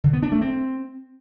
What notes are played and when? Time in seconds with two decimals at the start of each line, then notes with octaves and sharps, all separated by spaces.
0.04 D3
0.13 B3
0.23 D4
0.32 A3
0.41 C4